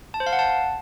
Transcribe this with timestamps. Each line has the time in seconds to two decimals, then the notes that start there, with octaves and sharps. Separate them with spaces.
0.14 A5
0.20 C5
0.26 F5
0.33 F#5
0.39 A5